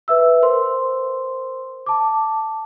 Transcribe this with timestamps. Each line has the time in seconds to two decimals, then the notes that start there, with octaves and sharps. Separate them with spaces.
0.08 B4 E5 E6
0.42 A#4 C5 C6
1.86 A5 D6